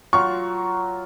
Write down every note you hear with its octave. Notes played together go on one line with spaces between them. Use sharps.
F#3 F4 C#6